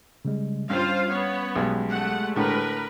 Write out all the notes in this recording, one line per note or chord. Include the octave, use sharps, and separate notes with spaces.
C#3 G3 G#3
G2 G3 C#4 F4 C5 F5
B3 C#5
B1 G#3 G4
A3 F#5
A2 D3 A#4 B4